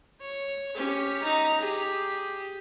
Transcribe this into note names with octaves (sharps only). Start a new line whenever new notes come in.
C#5
C#4 G4
D#4 A#5
G4 G#4